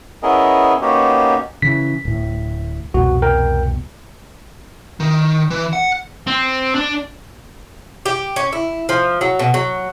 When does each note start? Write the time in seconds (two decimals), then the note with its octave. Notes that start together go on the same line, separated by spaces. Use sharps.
0.23 B3 C#4 E4 G#4 A#4 D#5
0.82 A#3 B3 C#4 D#4 F#4 G4
1.62 C#3 E3 B6
2.05 D1 A2
2.94 C2 F2 B2 F#4
3.22 A#4 G5
5.00 D#3
5.50 E3
5.73 F#5
6.27 C4
6.75 D4
8.06 G4
8.36 C#4
8.53 E4
8.89 F3
9.21 F#3
9.39 B2
9.54 F#3